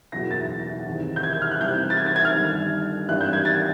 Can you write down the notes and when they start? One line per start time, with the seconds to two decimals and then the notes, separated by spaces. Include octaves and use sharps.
0.12 F#1 E2 B2 A#6
0.31 A6
0.86 E2 C3 D#3
1.16 G6
1.23 G#6
1.33 G6
1.42 F6
1.51 F#6
1.60 C2 C3 E3 G6
1.90 A6
1.97 G#6
2.06 A6
2.16 G#6
2.25 F6
2.34 G1 G2 D#3
3.08 G#1 G2 E3 F#6
3.21 G6
3.33 G#6
3.45 A6